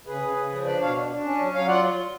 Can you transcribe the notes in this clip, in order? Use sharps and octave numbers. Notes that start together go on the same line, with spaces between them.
C#3 G#4 B4
C#3
C#3
F3
D4 B4 D5
B2 C#5 F5
D4
D4
C#4
F#3
F#3 C#5 F5
F4 D5 F#5